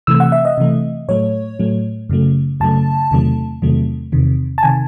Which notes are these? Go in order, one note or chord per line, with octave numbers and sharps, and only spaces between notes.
C3 E3 A3 E6
F#5
E5
D#5
C3 E3 A3
A2 F#3 A3 C#5
A2 F#3 A3
F#2 C#3 F#3 A3
F#2 C#3 F#3 A3 A5
E2 C3 D#3 F#3 A3
E2 C3 D#3 F#3 A3
E2 C3 D#3
A5
C3 D#3 G#5